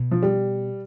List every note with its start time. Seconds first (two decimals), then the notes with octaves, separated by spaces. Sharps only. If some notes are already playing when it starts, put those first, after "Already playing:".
Already playing: B2
0.11 F3
0.23 G3